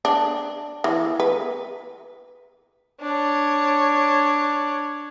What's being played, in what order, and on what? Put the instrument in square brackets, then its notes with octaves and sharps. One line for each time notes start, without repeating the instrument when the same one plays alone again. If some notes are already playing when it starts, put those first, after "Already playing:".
[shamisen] D4
E3
B4
[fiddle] D4 C#5